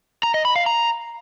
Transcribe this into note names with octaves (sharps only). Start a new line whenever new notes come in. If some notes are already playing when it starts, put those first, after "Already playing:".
A#5
D#5
B5
F5
A#5